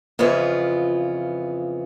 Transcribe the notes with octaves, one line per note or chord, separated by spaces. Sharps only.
F2 C#3 E3 B3 F4